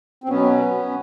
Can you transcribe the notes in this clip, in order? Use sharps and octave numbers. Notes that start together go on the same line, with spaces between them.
C4
B2 F#3 B3 C#4